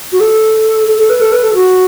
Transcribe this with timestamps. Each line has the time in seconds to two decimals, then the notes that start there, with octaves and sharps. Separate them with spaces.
0.12 F#4
0.20 A4
0.87 A4
0.98 A4
1.10 B4
1.21 A4
1.32 B4
1.43 A4
1.54 F#4